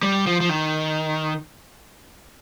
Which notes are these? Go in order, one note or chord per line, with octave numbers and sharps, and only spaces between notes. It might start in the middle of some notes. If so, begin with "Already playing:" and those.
G3
F3
F3
D#3